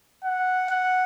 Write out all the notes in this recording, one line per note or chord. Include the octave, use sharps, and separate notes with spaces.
F#5
F#5